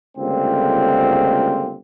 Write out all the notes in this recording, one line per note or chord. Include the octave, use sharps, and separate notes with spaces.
G1 C#2 D3 A3 A#3 C4